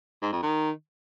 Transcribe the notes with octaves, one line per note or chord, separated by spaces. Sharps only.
G#2
F2
D#3